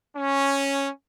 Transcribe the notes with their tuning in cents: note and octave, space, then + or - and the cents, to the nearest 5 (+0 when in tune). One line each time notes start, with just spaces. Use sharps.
C#4 -5